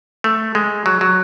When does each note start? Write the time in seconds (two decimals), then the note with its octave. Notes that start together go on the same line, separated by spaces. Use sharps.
0.24 A3
0.55 G#3
0.86 F#3
1.01 F#3